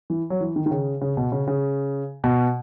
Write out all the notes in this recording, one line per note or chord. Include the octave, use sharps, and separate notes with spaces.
E3
F#3
E3
D#3
D#3
C#3
C#3
B2
C#3
C#3
B2